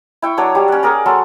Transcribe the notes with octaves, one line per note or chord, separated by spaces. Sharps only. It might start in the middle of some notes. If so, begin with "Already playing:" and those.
E4 G5 C#6
F#3 D4 C#5 D#6
G3 G4
C#4 F#5
G#4 A#4 D5
F#3 A4 C#5 C6